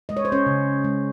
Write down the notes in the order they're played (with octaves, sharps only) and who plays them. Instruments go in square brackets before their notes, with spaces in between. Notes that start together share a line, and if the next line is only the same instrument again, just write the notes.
[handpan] G#3 D#5
C#5
C5
C#4 C#5
C#3
G#3